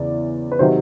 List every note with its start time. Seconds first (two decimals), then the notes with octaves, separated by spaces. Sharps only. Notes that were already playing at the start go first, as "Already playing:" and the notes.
Already playing: E2 C#3 E3 D5
0.52 B4
0.59 C3 D#3 F#3 C5